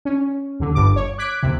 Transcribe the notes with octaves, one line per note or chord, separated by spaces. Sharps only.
C#4
D#2 D3
G1 G2 D6
C#5
D6 F#6 G#6 B6 D7
D#2 C3